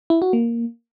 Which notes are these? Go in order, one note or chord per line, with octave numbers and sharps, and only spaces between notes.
E4
F#4
A#3